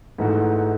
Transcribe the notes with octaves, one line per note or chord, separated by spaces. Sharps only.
G#2 E3 A3 D#4 F#4